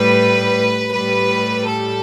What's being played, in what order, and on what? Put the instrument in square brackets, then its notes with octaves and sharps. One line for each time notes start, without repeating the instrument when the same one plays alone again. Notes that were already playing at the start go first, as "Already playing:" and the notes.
Already playing: [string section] A2 G3 B4
A2 G3 B4
A4